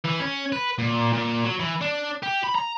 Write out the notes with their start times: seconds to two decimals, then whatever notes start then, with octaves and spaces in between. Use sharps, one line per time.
0.05 E3
0.20 C#4
0.52 B4
0.78 A#2
1.13 A#2
1.44 F#3
1.60 E3
1.81 D4
2.23 G4
2.44 B5
2.55 A#5